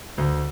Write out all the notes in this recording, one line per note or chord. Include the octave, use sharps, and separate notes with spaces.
D2